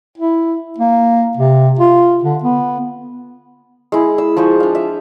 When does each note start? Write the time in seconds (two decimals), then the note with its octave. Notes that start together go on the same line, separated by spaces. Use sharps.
0.18 E4
0.78 A#3
1.37 C3
1.79 F4
2.24 D3
2.44 B3
3.92 G#3 E4
4.18 E6
4.37 F3 G#4 C5 C#6
4.60 D4 F5
4.75 E5